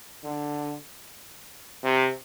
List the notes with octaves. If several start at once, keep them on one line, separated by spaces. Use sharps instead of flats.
D3
C3